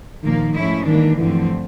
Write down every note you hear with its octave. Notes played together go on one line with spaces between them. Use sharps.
A#2 D#3 F3 A#3
G#2 F3 A3 C#4 E4
D#3 E3 G3 A#3 D4
G2 D3 E3 F3 A3 C4